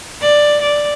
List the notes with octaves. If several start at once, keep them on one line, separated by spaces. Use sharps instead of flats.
D5
D5